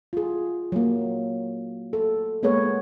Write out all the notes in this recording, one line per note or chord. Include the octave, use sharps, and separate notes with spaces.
F4 G#4
F#3 A#3
A4
G#3 A#3 B3 G#4 B4 C#5